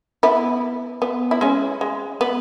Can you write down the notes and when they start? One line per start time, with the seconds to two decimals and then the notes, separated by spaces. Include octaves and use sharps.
0.23 B3 E4
1.02 B3
1.31 E4
1.41 G#3 C#4
1.81 G#3
2.21 B3